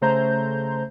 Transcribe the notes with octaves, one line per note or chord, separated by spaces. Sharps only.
C#3 A3 C5 A#5 G6